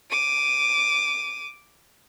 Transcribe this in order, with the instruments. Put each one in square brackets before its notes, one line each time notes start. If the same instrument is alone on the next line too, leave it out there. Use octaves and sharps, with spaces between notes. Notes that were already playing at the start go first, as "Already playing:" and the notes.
[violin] D6 D#7